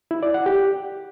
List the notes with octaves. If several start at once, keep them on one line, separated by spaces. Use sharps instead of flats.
E4
D5
F#5
G4